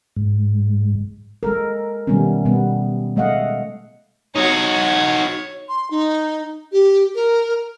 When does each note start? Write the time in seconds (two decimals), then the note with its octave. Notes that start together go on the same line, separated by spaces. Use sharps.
0.16 G#2
1.43 G#3 A4 A#4
2.07 B2 D#3 G3 A3 B3 C#4
2.45 B2 G3 B3
3.16 G#3 A3 D#5 F5 F#5
4.36 D#4 F#4 C#5
5.69 C6
5.91 D#4
6.72 G4
7.15 A#4